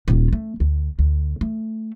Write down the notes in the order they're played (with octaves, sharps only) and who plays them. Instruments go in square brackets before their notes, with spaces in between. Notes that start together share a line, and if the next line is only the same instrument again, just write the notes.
[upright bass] D#1 F4
A3
D2
D2
A3